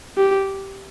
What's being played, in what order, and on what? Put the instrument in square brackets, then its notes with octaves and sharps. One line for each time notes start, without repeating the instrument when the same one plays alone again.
[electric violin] G4